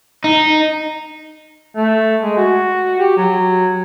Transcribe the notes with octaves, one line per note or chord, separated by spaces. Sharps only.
D#4
A3
G#3
F#4
G4
F#3